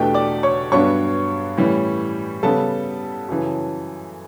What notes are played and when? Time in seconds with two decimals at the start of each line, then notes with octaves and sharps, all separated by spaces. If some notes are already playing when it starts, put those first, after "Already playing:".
Already playing: E2 B2 A3 D4 G4 G5
0.14 D5 D6
0.43 C#5 C#6
0.72 G2 F#3 B3 D4 C#5 C#6
1.57 A2 E3 G3 C#4
2.43 C#3 G3 B3 A4 A5
3.28 F#2 C#3 E3